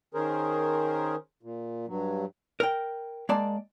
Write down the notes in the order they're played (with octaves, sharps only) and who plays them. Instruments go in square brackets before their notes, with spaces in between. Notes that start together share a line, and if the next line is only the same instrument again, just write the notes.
[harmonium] D#3 C#4 G#4 A#4 C5
A#2
G2 F#3
[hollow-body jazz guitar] A#4 G5
G#3 A#3 D5 A5